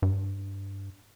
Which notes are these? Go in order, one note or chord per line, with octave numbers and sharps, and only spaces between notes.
G2